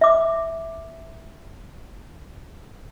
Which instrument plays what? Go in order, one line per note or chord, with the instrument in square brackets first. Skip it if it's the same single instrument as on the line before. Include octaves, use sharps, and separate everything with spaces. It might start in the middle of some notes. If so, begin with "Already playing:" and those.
[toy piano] E5 D6